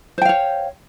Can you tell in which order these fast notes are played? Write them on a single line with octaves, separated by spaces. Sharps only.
C5 G5 F5 C#5